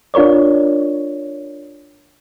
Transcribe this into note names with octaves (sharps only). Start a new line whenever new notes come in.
D4 F4 A#4 C#5 D5